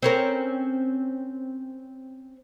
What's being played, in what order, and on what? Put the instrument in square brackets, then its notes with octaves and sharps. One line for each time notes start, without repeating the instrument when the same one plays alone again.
[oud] C4 C#4 A#4